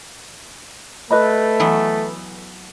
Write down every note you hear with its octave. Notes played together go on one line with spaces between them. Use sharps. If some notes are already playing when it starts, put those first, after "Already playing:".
A3 B4 D#5 B5
E3 F#3 B3